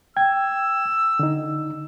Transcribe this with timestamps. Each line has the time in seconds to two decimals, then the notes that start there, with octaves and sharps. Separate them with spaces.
0.17 G5 E6 G#6
1.19 D3 D#4